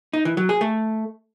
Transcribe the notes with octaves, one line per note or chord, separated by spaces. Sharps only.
D#4
E3
F#3
G#4
A3